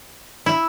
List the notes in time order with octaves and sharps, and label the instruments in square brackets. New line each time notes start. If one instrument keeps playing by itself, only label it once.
[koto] E4